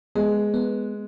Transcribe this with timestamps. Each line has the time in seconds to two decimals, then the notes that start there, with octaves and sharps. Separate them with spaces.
0.15 G#3 B3
0.54 B3